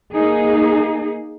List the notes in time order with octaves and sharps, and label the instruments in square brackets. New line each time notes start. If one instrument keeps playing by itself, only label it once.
[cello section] A#3 D#4 G#4